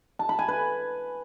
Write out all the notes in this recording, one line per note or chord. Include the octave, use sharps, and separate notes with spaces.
A5
B5
G#5
B4